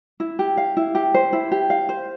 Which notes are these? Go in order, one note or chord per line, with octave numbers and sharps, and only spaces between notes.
E4
G4
F5
E4
G4
C5
E4
G4
F5
C5